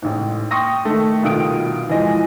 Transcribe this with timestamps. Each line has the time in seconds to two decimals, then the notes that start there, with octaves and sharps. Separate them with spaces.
0.02 A1 G#2
0.51 G5 C6 C#6 D#6 A#6
0.85 D#3 A3
1.22 C2 B2 D#3 F4 D#6 D7
1.89 E3 F3 G#3 D#5